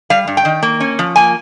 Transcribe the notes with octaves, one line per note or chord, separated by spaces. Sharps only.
G3 F5
G2
G5
D#3
A#3
C#4
F3
A#3 G#5